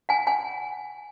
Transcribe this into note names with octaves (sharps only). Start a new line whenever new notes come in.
F#5 G#5
F#5 G#5